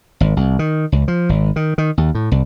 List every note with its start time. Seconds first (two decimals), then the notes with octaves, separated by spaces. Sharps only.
0.20 G#1
0.37 C2
0.59 D#3
0.92 C#2
1.08 F3
1.29 G#1
1.56 D#3
1.78 D#3
1.98 D#2
2.15 A2
2.32 C2